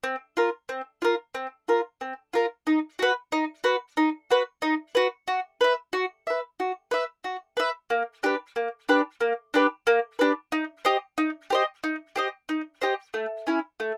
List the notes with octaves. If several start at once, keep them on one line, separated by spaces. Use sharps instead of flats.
C4
F4 A#4
C4
F4 A#4
C4
F4 A#4
C4
F4 A#4
D#4
F#4 B4
D#4
F#4 B4
D#4
F#4 B4
D#4
F#4 B4
F#4
B4 E5
F#4
B4 E5
F#4
B4 E5
F#4
B4 E5
A#3
D4 G4 B4
A#3
D4 G4 B4
A#3
D4 G4 B4
A#3
D4 G4 B4
D#4
G4 C5 D#5
D#4
G4 C5 D#5
D#4
G4 C5 D#5
D#4
G4 C5 D#5
A3
C#4 E4
A3